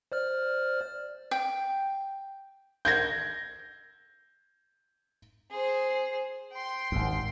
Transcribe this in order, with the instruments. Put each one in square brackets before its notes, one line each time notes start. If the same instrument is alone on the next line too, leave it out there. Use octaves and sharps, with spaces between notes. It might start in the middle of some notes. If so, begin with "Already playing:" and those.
[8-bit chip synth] C5 D5 F6
[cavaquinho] G5
[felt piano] G6 G#6 A#6
[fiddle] G#4 C5
G5 C6
[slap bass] G#1 D#2